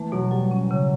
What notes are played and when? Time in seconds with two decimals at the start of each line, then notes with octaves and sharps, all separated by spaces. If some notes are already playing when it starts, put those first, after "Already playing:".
Already playing: E3 A3
0.12 B2 F#3
0.31 F#3 G3
0.51 C#4
0.71 C#3